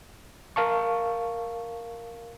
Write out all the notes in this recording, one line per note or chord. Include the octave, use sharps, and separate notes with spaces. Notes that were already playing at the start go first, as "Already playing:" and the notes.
A#4 F5 A5 C#6